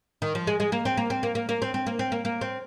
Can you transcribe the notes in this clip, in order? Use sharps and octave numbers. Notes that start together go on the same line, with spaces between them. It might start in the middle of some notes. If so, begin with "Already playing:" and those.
D#3
F3
G#3
G#3
A#3
C4
A#3
C4
A#3
A#3
A#3
C4
C4
A#3
C4
A#3
A#3
C4